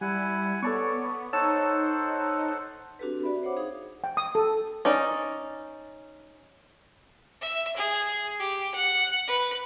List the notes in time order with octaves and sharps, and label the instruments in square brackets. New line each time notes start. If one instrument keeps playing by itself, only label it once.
[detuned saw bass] G3 [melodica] E4 F#5 G#5
[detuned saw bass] B3 [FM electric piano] A4 A5 C#6 [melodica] C#5 D5
[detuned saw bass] D#4 [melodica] A4 C5 F#5 [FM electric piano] C#5 A5 E6
[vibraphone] C4 D4 F#4 G4 A4 B4
F#4 D5 E5 B5
C5 C#5 F#5 D6
D#4 G#4 F5 D#6
[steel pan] G5
D#6
A4
[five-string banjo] C#4 D#4 D5
[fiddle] E5
G#4
G4
F#5
B4